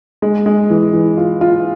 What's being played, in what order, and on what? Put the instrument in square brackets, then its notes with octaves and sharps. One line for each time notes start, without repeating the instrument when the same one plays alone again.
[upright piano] G#3
G#3
E3
E3
F4
F4